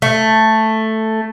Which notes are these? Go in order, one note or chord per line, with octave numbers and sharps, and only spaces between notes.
A3